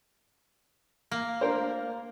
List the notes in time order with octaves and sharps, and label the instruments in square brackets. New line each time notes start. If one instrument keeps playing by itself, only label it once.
[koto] A#3
[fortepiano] D4 A#4 C5